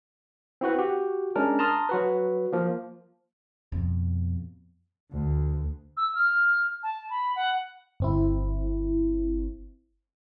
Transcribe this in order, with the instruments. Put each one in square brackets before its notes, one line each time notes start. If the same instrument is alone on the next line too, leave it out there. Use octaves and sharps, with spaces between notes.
[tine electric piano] C4 E4 F#4 B4
F#4 G4
G#3 C#4 D4 A#4
A5 A#5 C6 D#6 F6
F#3 F#4 B4
F3 A#3
[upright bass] F2 B2
[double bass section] D2
[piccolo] E6
F6
A5
B5
F#5
[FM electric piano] G1 C4 E4